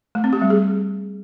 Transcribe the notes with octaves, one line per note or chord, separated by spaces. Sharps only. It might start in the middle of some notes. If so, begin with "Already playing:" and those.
A3
C4
G4
G3
G#4